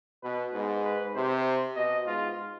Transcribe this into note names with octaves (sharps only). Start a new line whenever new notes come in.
B2 B4
G#2
B4
C3 C5
B2 D#5
G#2 F4